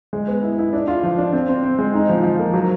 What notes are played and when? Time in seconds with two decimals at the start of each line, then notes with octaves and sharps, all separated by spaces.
0.13 G#3
0.28 B3
0.43 E4
0.58 E4
0.73 D4
0.88 F4
1.03 F3
1.18 D4
1.33 C4
1.49 C4
1.63 C4
1.79 G#3
1.94 D#4
2.09 F3
2.23 F3
2.39 A#3
2.54 F#3